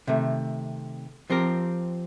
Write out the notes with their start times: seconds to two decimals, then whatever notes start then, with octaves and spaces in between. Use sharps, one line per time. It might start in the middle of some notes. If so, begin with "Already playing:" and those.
0.07 C3 D#3 A3
1.30 F3 C4 G4 A#4